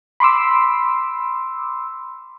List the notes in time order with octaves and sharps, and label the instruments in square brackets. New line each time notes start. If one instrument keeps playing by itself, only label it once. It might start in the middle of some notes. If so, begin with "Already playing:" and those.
[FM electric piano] B5 C6 D6 E6